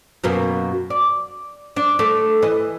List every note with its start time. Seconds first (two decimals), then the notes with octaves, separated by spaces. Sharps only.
0.24 F#2 B2 A#3
0.90 D5
1.76 D4
1.99 A3 D5
2.42 E3 D#5